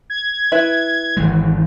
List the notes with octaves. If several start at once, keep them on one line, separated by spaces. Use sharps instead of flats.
G#6
E4 B4 E5
G#1 E3 G#3